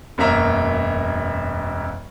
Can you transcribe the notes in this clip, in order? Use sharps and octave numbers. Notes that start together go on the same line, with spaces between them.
E1 F#2 A#3 E5 A#5